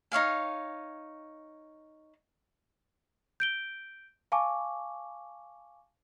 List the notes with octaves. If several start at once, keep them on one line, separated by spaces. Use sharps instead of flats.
D#4 C#5 F5 G#5
G6 D7 G7
F5 G#5 A5 C#6 D6